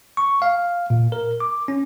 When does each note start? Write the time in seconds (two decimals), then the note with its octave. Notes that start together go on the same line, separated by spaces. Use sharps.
0.17 C#6
0.42 F5
0.90 A#2
1.12 A#4
1.40 D6
1.68 C#4